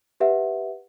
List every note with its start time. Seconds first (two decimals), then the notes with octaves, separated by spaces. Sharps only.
0.20 G4 B4 E5 F#5